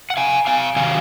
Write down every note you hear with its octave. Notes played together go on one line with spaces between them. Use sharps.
F#5
F5 G#5
F5 G#5
C3 D#3 F#3 F5 G#5